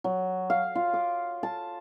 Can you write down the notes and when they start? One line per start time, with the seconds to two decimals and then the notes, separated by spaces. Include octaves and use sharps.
0.04 F#3
0.50 F5
0.75 F4
0.94 D6
1.43 A5